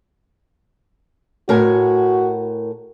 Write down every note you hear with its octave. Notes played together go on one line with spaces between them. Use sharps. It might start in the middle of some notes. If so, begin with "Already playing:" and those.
A2 F#4 A#4 G#5